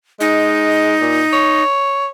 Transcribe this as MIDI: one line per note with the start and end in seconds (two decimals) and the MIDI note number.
0.20 0.96 56
0.20 1.63 63
1.01 1.23 46
1.33 2.08 73